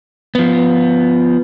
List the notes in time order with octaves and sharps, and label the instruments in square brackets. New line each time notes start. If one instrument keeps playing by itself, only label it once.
[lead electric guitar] F3 B3